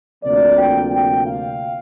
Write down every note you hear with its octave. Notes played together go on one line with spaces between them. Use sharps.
D2 C3 F3 A#3 D5
G5
G5
F5